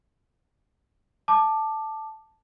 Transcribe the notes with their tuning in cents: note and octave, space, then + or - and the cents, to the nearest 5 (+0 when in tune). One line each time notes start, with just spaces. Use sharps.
A5 +0 D6 +15